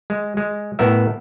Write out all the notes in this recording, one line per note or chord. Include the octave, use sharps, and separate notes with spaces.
G#3
G#3
A2 B3 A#4 E5